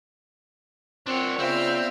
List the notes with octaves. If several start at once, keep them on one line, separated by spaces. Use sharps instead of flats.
C4 D4 F4 A#4 C#5 F#5
C#3 B3 C4 F4 C5 D5 E5 F5